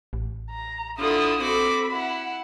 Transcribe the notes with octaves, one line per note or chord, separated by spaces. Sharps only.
A1
A#5
D3 E4 F4 D#6
C4 F#4 A4 B5 D6
E4 F#5